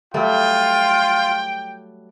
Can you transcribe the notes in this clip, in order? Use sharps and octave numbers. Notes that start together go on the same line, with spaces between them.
F#3 G3 A3 F4 G5